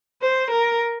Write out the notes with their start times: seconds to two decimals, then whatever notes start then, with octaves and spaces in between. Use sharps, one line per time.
0.22 C5
0.51 A#4